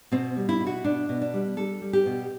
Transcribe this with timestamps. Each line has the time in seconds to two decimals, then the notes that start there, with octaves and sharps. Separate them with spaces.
0.12 B2 C4
0.36 G3
0.49 E4
0.60 B2
0.67 F#4
0.84 B2 D4
1.09 B2
1.21 D4
1.34 G3
1.57 G3 A4
1.81 G3
1.93 G4
2.06 B2